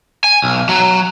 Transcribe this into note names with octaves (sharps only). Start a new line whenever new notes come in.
G#5
B1
F#3